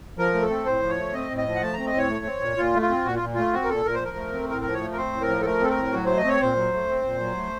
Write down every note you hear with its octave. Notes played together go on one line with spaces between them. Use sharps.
F3 A#4
A3
A4
C4
A2 C5
F3
C#5
A3
C4 D#5
A2
D#5
F3
F#5
A3 A5
C4 A#5
D#5
A2 C#5
A3
C4
A#2
A#2 F4
A3
F4
C4
A#2 F#4
F4
A#2
A3 F4
C4 F#4
A#4
A#2 A4
A#2 A#4
C5
F3 A#4
A3
C4
A2 A#4
F3 A#4
C#5
A3
A#4
C4 C5
A2
A#4
F3
A4
A3 A#4
C4 A4
A#4
A2
F#3 F#4
A3 C5
D#5
C4 C#5
A#2 C5
F#3
A3
C4
A#2
F#3
A3